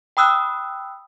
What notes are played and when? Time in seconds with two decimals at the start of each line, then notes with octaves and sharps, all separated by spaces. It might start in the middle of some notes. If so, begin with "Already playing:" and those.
0.17 G5 B5 D#6 E6 F#6